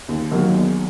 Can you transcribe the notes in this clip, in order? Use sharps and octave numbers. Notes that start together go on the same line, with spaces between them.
D#2
D#3 F#3 A#3
E2